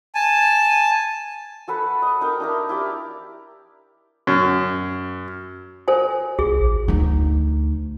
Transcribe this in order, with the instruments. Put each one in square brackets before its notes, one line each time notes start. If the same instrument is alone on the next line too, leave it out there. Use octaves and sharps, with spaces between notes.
[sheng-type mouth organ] G#5 A5
[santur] F#4 A4 B4 B5
D#5
D#4 A#4 G5
D4 E4 A#4
E4 G4 D5
[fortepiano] F#2
[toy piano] A4 C5 G#5
[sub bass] C2 [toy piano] G#4
[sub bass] A1
[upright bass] D2 D#4